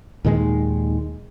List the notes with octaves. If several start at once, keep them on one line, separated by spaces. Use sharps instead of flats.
D#2 A#2 D#3 G#3